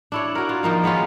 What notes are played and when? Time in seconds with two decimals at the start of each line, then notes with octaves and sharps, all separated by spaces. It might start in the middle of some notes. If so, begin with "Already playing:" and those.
0.12 D4 E4 C#5
0.35 F#4 A#4
0.49 F4
0.63 D#3 F3 A#3 D#4
0.84 G#3 B3 C#4 F4